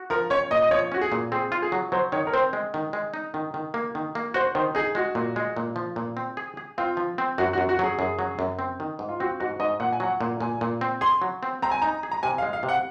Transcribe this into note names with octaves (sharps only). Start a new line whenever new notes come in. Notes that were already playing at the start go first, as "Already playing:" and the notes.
Already playing: F#4
F3 A#4
C#4 C#5
A#2 D#5
D#5
F3 C#5
C#4 F#4
G#4
A#2
C4 G#4
F4
G#4
F#3
F#3 C5
D#3 C#5
A#4
C4 C5
G#3
D#3
G#3
D#4
D#3
D#3
A#3
D#3
A#3
F#4 C5
D#3 C5
D#4 G#4
G#3 F#4
A#2
G#3
A#2
F3
A#2
C4
G#4
G#4
C4 F4
F3
C4
F#2 F#4
F#4
F#2
F#4
F#3 G#4
F#2 G#4
F#3
F#2
C4
D#3
G#2
F4
C4 F#4
G#2 F#4
G#2 D#5
A#2 F#5
G#5
F#3 F#5
A#2
A#2 G#5
A#2
C4
G#4 C6
F#3
C4
C4 A#5
G#5
D#4 A#5
G#4
A#5
C3 G#5
F5
G#3
F5
C3
F#5